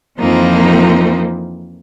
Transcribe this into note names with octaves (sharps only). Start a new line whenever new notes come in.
F2 E3 F3 A#3 C4 D#4